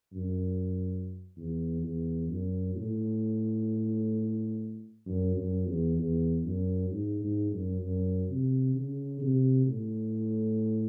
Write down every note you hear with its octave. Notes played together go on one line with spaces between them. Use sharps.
F#2
E2
E2
F#2
A2
F#2
F#2
E2
E2
F#2
G#2
G#2
F#2
F#2
C3
C#3
C3
A2